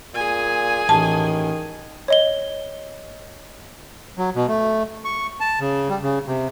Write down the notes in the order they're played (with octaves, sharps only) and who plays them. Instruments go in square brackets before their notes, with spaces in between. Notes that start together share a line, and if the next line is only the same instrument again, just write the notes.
[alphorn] A#2 [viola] G#4 G#5
[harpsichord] A1 [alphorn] D#3 [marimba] A5
[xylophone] C#5 D#5 G7
[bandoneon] F#3
B2
A3
C#6
A5
C#3
G3
C#3
C3